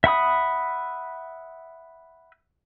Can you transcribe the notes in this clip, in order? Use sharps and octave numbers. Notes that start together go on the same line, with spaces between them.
E5 F#5 B5 D#6